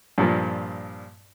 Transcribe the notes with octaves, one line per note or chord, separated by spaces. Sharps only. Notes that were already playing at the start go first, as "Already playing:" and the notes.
G2 A#2 F3